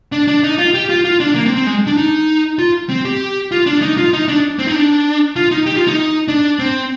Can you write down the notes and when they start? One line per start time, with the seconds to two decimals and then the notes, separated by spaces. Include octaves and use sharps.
0.12 D4
0.28 D4
0.43 D#4
0.58 F4
0.74 G4
0.89 F4
1.05 F4
1.20 D4
1.35 A#3
1.46 C4
1.56 C4
1.66 G#3
1.87 D4
1.97 D#4
2.59 F4
2.89 C4
3.05 G4
3.52 F4
3.66 D4
3.82 D#4
3.98 F4
4.13 D#4
4.28 D4
4.59 C4
4.67 D#4
4.74 D4
5.36 F4
5.51 D#4
5.66 G4
5.76 F4
5.87 D#4
6.28 D4
6.59 C4